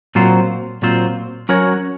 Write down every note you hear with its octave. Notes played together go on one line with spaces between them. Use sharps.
A#2 F#3 C4 F4 C5
A#2 F#3 C4 F4 C5
F#3 C#4 F#4 A#4 C#5